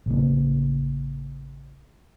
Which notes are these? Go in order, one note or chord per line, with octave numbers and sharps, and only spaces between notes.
A1 C#3 A#3